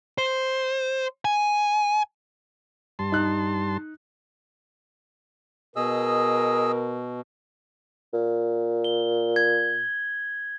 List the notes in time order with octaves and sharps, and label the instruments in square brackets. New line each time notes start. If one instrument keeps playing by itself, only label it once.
[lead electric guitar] C5
G#5
[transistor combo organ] G2 A5 C6
[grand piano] D#4 F#6
[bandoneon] B2 [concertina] G#4 D#5 E6 [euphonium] A#4
[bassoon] A#2
[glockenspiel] G7
G#6